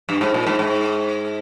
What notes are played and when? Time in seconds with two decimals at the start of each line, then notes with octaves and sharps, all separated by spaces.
0.09 G2
0.21 G#2
0.34 A#2
0.47 G#2
0.59 G#2